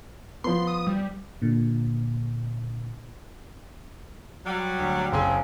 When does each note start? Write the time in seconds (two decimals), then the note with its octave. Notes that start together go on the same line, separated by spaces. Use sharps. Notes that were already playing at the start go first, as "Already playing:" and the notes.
0.44 F3 B3 C6
0.67 D#6
0.87 G3
1.42 A#2 D3
4.46 F#3 G3
4.80 D2
5.12 F#1 C4 G#4 G#5